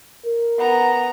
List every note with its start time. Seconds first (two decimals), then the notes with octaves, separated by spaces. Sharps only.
0.25 A#4
0.58 B3 A#5